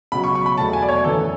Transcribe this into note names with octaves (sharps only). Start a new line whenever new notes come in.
C#2 B2 F#3 B5
C#6
C#6
B5
E2 B2 F#3 A3 A5
G#5
D5
C#5
F#2 E3 B3 A4